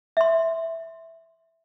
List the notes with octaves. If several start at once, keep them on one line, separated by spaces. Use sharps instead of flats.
E5 C6